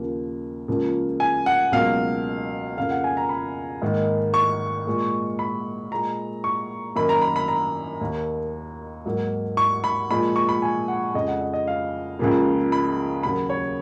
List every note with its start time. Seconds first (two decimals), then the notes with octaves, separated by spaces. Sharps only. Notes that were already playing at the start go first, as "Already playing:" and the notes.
Already playing: D#2 C#3 F3 A#3
0.68 C#2 C#3 F3 A#3
1.20 G#5
1.46 F#5
1.72 C#2 B2 F#3 A#3 F5
2.77 F2 C#3 F3 A#3 F5
2.91 F#5
3.04 G#5
3.17 A#5
3.29 B5
3.82 G#2 D#3 A#3
4.34 C#6
4.87 A#2 G#3
5.39 B5
5.92 A#2 G#3 A#5
6.44 C#6
6.95 F#2 D#3 A#3 B5
7.09 A#5
7.22 B5
7.36 B5
7.48 A#5
8.01 D#2 D#3 A#3
9.06 G#2 F#3 A#3
9.57 C#6
9.84 B5
10.10 A#2 F3 G#3 B5
10.36 C#6
10.49 B5
10.62 G#5
10.88 F#5
11.14 F2 C#3 F3 G#3 D#5
11.28 F#5
11.41 D#5
11.53 D#5
11.68 F5
12.19 C#2 C#3 F3 A#3
12.72 B5
13.23 D#2 C#3 F#3 A#3 B5
13.50 C#5